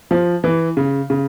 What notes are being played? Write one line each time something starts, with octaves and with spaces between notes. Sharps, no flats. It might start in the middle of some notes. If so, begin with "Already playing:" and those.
F3
E3
C#3
C#3